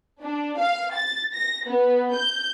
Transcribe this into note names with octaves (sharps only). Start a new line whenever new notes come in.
D4
F5
A6
A#6
B3
G6